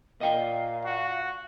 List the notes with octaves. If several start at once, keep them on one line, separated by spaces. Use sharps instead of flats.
A#2 D#5 F5 G5
F#4